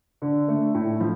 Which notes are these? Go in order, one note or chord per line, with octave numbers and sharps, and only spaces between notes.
D3
A3 D4
A2
F3